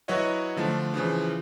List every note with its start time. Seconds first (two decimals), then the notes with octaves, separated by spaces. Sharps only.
0.08 F#3 E4 F#4 B4 C#5 D#5
0.57 D3 F3 A3 D4
0.94 C#3 E3 F3